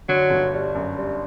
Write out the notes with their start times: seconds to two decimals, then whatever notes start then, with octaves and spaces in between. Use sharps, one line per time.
0.09 D3 F#3
0.30 G1
0.53 G3
0.75 F#2
0.97 G3